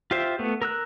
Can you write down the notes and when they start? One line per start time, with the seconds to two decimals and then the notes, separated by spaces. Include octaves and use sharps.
0.11 F4 G4 C5 E5
0.39 A3 B3
0.62 A#4 E6 F#6